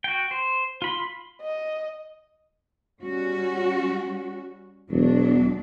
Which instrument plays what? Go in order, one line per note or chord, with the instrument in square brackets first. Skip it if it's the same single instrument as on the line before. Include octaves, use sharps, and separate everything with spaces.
[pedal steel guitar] F#4 G5
C5
F4 B5 C6
[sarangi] D#5
[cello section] G3 C#4 F#4
[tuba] E1 [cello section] E2 F#3 D4